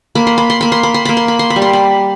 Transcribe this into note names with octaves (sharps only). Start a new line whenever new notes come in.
A#3 B5
C6
B5
C6
A#3 B5
C6
B5
C6
A#3 B5
C6
B5
C6
B5
G3
C6
B5